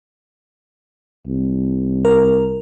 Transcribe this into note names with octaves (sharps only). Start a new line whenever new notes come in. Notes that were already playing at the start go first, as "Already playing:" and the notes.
C2
A#4